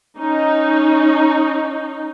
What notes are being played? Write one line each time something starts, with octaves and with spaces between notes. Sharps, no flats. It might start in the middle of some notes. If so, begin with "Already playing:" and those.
C#4 D#4